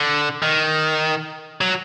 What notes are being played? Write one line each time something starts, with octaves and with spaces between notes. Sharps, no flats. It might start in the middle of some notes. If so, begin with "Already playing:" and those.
Already playing: D3
D#3
F#3